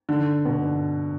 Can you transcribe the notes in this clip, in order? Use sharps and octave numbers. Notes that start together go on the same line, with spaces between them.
D3
B2
D3